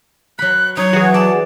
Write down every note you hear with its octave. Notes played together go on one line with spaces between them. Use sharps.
F#3 B5 F#6
F#3 D#4 C#5
E3 F#4 G#4
D5 A5